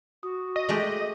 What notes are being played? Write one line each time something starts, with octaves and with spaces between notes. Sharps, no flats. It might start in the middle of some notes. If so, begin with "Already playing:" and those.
F#4 D#6
D#5
G#3 A3 G4 G#4